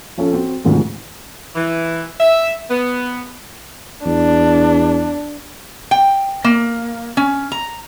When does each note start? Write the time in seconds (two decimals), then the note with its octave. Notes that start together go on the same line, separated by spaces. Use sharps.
0.17 F3 C#4 A4
0.33 C4 F#4
0.65 D2 G#2 C3 D#3 F3 G#3
1.56 E3
2.20 E5
2.70 B3
4.06 E2 D4
5.91 G5
6.44 A#3
7.17 C#4
7.52 A#5